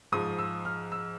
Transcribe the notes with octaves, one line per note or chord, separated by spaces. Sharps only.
G#2 F3 G#3 D#6
E6
F6
E6